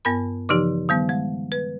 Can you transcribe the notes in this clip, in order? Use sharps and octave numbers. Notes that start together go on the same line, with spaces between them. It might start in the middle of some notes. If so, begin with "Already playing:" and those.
G2 B3 A#4 B5
C#3 E3 F3 D#4 G4
D#3 G3 B3
G#3
B4